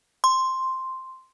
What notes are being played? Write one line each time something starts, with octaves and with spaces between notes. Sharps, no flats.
C6